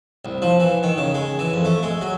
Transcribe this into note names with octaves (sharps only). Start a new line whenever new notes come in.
C2
F3
E3
D#3
C#3
G#3
E3
F2
A3
G#3
F#3